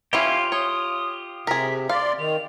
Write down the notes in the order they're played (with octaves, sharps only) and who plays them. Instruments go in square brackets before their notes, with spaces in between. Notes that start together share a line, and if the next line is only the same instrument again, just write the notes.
[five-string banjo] E3 C#4 E4 [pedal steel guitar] F4 G4 [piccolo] F5
[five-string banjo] C#5 [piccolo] D#6
[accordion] C3 [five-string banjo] G#4 A#4 [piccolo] B6
[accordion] D5 [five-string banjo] F5 [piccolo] C6
[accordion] D#3 [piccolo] F7